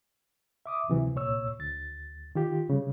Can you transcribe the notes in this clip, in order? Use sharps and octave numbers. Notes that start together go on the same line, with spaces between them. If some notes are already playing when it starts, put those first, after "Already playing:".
E5 D6 D#6
D2 C3 E3 F#3
C2 A#2 C#5 E6
D2 A6
D#3 F4 G4
C#3 G3